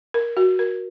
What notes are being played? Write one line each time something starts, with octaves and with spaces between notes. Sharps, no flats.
A#4
F#4
A#4